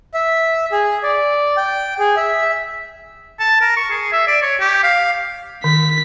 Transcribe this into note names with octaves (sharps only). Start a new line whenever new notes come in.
E5
G#4
D5
G5
G#4
E5
A5
A#4
C#6
G#4
E5
D5
C#5
G4
F5
D#3 B6